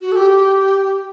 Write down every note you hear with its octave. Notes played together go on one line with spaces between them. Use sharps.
F#4
A4
G4